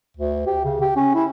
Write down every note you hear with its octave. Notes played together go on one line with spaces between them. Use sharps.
D2
G4
C#3
G4
C#4
E4